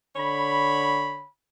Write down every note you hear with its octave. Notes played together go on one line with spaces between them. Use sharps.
D3 C#5 B5